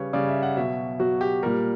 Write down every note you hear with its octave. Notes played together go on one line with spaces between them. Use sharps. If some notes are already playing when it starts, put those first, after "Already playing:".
Already playing: C#3 G3 B4 C#5
C#3 G3 D5
E5
F#5
B2 F#3 E5
B2 F#3 F#4
G4
A#2 G3 A#4